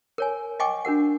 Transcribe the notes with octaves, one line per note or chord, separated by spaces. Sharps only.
A#4 C#5 G#5
D#5 G5 G#5 C#6 D6
D4 F#4 A#4 F#5